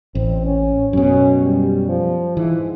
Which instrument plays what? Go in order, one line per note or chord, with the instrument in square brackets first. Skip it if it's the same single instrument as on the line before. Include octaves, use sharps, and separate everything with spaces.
[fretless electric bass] A1 [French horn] C4
[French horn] C#4
[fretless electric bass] F#2 B2 [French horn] C#4
[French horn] G3
F3
[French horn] G#2 [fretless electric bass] E3